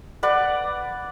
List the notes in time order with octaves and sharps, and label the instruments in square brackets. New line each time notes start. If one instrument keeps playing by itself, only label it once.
[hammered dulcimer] B4 D5 F#5